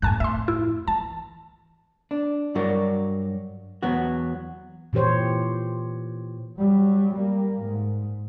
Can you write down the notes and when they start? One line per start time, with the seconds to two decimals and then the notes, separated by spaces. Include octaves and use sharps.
0.02 F#2 A2 G#5 A5 F#6
0.20 F2 A2 E5 C6
0.48 E4
0.88 E3 A5
2.11 D4
2.55 G2 F#3 F#4 A#4 D5
3.83 E2 F#3 B3 F#4
4.93 A#2 E3 G4 C5 C#5
6.58 F#3 G3
7.14 G3 A#3
7.62 G#2